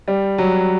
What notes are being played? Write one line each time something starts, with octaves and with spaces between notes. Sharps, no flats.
G3
F#3